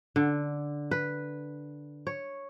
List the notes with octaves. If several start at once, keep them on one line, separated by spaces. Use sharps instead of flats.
D3
B4
C#5